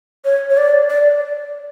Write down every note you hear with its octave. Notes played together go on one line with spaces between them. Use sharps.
C#5
C#5
D5
D5